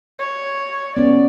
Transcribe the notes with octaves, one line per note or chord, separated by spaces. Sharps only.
C#5
B3 C#4 D5